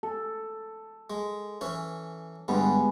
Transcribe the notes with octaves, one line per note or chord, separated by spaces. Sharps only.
A4
G#3
E3 C#4 E4
G2 D3 G3 G#3 B3